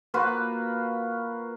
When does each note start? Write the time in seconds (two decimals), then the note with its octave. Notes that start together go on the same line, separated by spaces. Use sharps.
0.14 A#3 F4 F#4 B4